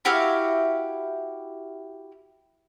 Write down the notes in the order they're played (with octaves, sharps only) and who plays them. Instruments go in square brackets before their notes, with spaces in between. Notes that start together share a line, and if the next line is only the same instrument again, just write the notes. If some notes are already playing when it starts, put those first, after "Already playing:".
[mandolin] E4 F#4 G4 F5